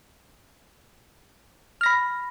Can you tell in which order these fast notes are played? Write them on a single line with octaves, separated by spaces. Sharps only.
F6 A#6 B5